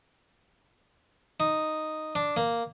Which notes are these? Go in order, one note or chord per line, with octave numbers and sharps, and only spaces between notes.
D#4
D4
A#3